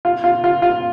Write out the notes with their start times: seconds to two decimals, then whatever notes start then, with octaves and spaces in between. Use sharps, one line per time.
0.05 F4
0.24 F4
0.44 F4
0.62 F4